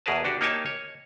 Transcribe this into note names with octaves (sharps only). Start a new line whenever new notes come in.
E2 B2 G#4 A#4 B4 A5
D4 F#4 G4
A#3 D#4 G4 C#5 G#5 A5
C#5